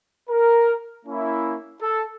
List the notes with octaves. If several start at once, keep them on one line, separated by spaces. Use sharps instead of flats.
A#4
A#3 C#4 E4
A4